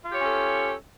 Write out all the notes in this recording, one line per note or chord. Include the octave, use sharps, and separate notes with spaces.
C#4 F4 G4 A4 C#5